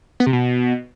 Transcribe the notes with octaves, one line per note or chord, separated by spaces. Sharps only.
B3
C3
B2